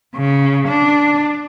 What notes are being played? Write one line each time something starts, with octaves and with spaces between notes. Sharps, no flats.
C#3
D4